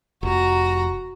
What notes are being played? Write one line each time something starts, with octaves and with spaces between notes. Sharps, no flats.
F1 F#4 A#5